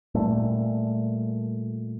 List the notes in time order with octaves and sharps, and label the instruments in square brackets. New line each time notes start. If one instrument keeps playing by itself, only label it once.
[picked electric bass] A#2 G3 A3